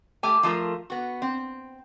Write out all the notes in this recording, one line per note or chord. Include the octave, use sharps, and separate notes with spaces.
A3 G4 G#5
F3 A3 F4 A#4
B3 F#4
C4